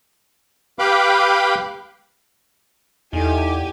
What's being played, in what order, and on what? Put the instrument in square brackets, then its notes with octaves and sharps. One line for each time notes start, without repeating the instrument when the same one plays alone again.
[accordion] G4 B4 F5 G5 B5 D6
[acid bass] E2 [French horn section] D#4 E4 A4 [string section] G4 G#5